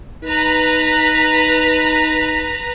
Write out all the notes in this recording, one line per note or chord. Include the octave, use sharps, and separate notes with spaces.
D#4 B4 A#5